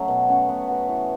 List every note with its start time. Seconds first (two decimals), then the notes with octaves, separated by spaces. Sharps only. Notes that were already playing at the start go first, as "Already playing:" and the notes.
Already playing: F#3 A3 C#4
0.08 B2
0.28 A3 C#4 F#4
0.49 B3
0.68 F#4 B4
0.88 E3